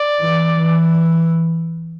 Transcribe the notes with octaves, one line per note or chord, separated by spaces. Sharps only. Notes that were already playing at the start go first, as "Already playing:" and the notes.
Already playing: D5
E3
E3